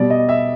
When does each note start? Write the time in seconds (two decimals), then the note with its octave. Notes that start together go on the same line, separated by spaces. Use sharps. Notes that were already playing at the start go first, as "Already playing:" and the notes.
Already playing: B2 G3 D5
0.10 D#5
0.29 E5